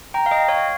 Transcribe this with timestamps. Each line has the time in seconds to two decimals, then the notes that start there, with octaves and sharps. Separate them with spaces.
0.14 G5 A#5
0.26 F5
0.31 D#5 G5
0.48 C#5 F5